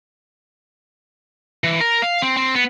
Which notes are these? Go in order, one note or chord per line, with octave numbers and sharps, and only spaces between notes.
E3
A#4
F5
C4
C4
B3